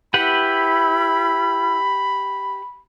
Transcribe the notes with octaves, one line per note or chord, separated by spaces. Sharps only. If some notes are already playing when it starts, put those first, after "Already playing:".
E4 G4 B4 F#5 B5